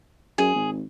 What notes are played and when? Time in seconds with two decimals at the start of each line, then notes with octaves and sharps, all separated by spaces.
0.38 F#2 G#4
0.55 G#1